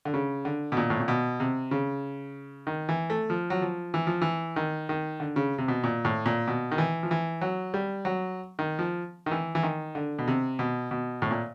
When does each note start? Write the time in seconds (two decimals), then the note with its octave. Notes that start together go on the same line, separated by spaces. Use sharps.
0.05 D3
0.14 C#3
0.45 D3
0.72 B2
0.77 A#2
0.90 A2
1.00 A#2
1.08 B2
1.40 C3
1.71 C#3
2.67 D#3
2.89 E3
3.10 A3
3.30 F3
3.50 F#3
3.61 F3
3.94 E3
4.07 F3
4.22 E3
4.56 D#3
4.89 D#3
5.20 D3
5.36 C#3
5.58 C3
5.68 B2
5.84 A#2
6.05 A2
6.26 A#2
6.48 B2
6.72 D#3
6.78 E3
7.03 F3
7.11 E3
7.41 F#3
7.74 G3
8.05 F#3
8.59 D#3
8.79 F3
9.26 D#3
9.31 E3
9.55 E3
9.63 D#3
9.95 D3
10.19 B2
10.28 C3
10.59 B2
10.91 B2
11.22 A2
11.31 A#2